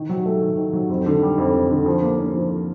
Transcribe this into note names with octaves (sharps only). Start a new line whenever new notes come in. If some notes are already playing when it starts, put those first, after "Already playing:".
Already playing: D#3
F#3
A3
D#3
D#3
F#3
F2
D3
G3
F2
F2
D3
F3
A#3
C#4
F3
F3